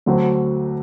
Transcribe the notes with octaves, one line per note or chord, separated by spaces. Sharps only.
D2 D3 F#3 C4